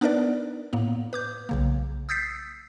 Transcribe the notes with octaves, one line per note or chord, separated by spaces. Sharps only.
B3 D4 D#4 A#4 B4 D5
A2 A#3 B3
B4 D6 G6
B1 C#3 A#3
D#6 E6 G6 A6 B6 C7